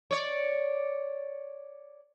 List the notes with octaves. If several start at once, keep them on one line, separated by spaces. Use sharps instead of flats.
C#5 D5